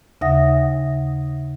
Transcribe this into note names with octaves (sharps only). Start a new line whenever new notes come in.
D#2 C#3 E5 F#5 D#6 A#6